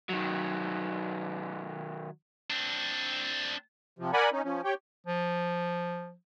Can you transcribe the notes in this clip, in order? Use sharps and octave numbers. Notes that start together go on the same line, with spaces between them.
D#3 F#3
C4 D4
C3 F3
A#4 D5 F#5 G#5 B5
C#4 D#4
F3 C#4
G4 C#5 G5
F3